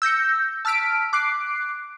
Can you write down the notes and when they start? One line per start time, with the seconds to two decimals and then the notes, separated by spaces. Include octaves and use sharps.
0.02 E6 G6 A#6 C#7
0.65 A5 E6 F6 B6 D7
1.13 D6 F#6 C7 D7